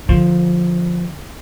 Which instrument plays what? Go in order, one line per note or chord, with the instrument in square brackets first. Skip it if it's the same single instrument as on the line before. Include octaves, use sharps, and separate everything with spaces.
[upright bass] D3 [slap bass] F3